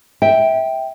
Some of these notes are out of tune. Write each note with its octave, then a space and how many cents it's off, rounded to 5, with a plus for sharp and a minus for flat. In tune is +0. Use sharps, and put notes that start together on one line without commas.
E5 -20 G5 +0